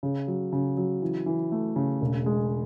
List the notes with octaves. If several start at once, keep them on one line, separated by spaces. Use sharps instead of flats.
C#3
F#3
C#3
F#3
E3
E3
A3
C#3
E1
G#3